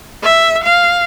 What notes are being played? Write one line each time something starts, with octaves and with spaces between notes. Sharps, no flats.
E5
F5